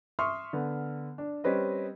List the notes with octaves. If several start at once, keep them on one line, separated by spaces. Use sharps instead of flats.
E5 C6 C#6 D#6 F6
D3 B3
D4
G3 C4 C#4 B4 D#5